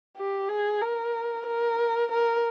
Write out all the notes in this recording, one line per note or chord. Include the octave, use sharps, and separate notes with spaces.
G4
G#4
A#4
A#4
A#4